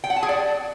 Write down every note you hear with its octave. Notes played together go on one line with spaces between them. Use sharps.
G5
F#5
A5
G#4
D5